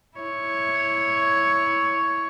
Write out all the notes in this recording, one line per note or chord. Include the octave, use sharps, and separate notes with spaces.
E4 C#5